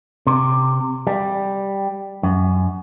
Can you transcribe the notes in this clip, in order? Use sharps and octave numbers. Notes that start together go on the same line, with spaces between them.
C3
G3
F#2